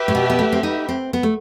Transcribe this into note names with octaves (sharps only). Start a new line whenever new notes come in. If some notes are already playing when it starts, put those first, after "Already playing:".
Already playing: G4 B4 E5
A2
B2
B3
A3
C4
D#4
C4
B3
A3